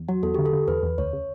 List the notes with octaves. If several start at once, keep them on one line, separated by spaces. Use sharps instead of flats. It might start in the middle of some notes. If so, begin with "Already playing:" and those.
Already playing: E2
F#3 F#4
E2 A4
D3 G4
A4
D3
E2 B4
E2
D2 C#5
C#3